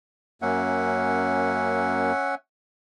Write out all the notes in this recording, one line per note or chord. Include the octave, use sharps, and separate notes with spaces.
F#2 A#3 C#4 E5 F#5